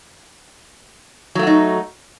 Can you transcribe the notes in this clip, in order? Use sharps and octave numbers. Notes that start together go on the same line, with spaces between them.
F#3 A3 D#4 F#4